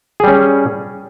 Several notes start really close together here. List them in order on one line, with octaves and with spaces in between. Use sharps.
G#4 G3 C#4